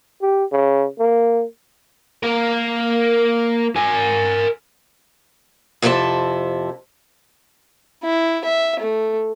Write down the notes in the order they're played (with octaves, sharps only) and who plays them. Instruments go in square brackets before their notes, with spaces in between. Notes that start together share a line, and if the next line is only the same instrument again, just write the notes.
[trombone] G4
C#3
A#3
[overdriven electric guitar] A#3 A#4
A#4 G#5
[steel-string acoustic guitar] F2 C3 E4 G4 A4 A5
[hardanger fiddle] E4
E5
A3